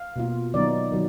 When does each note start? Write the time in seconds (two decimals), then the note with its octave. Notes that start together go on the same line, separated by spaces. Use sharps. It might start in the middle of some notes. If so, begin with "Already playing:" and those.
Already playing: F5
0.16 B2 A#3 F4
0.54 D#3 F#3 B3 D#4 D5
0.92 D#3 F#3